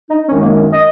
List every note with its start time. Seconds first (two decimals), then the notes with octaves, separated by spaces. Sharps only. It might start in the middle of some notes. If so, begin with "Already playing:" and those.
0.10 D#4
0.28 F#2 D#3 G#3 C#4
0.42 A#3
0.56 C#4
0.72 D#5